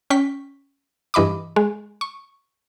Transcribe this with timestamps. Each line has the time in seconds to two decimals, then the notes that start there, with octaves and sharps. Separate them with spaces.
0.10 C#4 G5 C#6 B6
1.14 G2 E3 D#5 B5 D6
1.56 G#3
2.01 C#6